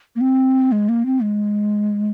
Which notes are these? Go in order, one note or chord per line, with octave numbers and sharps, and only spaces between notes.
A#3
C4
G#3
A#3
C4
G#3